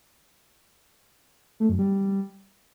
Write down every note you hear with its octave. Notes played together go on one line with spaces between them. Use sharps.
A3
F#2
G3